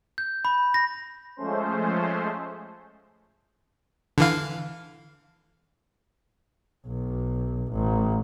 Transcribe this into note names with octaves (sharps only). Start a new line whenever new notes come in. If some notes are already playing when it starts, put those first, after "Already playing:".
G6
B5
A#6
F3 G#3 A3 C#4 C5
D3 E3 F5
B1
A1